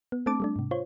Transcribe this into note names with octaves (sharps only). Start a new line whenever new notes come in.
B3
A3 C4 D4 A5 D6
G3 A3 D4
G#2 C3
F4 C5 C#5